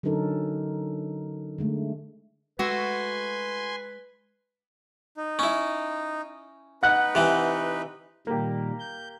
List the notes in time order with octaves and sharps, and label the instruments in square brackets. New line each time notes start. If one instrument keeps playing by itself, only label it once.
[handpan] D3 F#3 C#4 D#4 A4 A#4
D3 G#3 A3
[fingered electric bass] G#3 [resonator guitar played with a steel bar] A3 F#4 [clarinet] B4 [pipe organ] G#5 C6
[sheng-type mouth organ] D#4
[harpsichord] C#4 E4
[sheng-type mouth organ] D#4 B4 [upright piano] F#5 F#6
[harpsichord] C3 E3
[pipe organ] A#2 D#3 G3 [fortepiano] A#3 G4
[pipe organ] G6